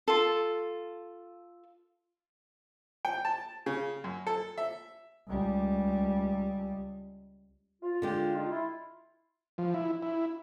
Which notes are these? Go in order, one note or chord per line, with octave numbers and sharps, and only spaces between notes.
F4 A4
G5
A5
C#3
F#2
A4
E5
C#2 G3
F4
D3 G#3 G4
D#4 F4
E4 F4
F3
E4
E4